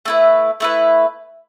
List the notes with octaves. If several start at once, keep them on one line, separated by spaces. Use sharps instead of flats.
A3 E4 B4
A3 E4 B4